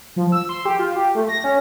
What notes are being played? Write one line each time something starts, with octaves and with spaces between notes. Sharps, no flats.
F3
E6
C6
G4
F4
G4
A3
A#6
C#4